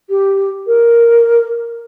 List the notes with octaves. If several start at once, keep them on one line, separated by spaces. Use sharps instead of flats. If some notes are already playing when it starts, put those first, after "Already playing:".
G4
A#4